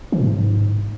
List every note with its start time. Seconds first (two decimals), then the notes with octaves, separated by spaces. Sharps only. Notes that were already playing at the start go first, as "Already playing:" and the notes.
0.12 E3
0.18 A#2
0.24 G#2